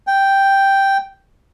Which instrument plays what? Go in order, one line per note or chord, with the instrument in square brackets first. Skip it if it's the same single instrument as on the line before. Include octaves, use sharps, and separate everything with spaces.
[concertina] G5